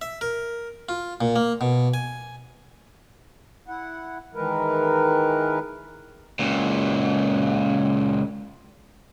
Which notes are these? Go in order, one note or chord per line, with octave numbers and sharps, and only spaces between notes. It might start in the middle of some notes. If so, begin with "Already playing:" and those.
E5
A#4
F4
A#2
A#3
B2
G#5
E4 F#5
D#3 E3 G#3 A#4 B4
C#2 A#2